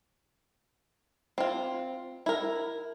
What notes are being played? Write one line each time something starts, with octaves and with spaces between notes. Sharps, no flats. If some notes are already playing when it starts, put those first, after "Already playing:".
C4 F4
E4 A#4